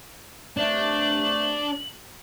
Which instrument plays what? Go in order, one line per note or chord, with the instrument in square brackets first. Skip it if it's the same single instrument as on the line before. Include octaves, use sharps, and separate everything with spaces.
[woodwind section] G2 C3 A3 [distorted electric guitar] D4 [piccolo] F#7